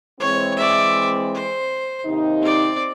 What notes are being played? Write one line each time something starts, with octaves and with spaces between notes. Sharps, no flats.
E3 G#3 C4 C#5
D5 E5
C5
D#2 C3 D#4
C4 D5